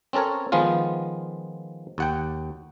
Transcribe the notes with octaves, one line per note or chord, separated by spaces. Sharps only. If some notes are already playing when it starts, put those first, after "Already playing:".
C4 C#4 A4 A#4 C#5
D#3 F3 G#3 B3 F4
D#2 F#5 G5